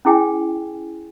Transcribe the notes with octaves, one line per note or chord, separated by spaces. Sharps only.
C#4 E4 G#4 G5 G#5